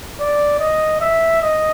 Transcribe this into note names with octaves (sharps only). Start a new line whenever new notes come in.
D5
D#5
E5
D#5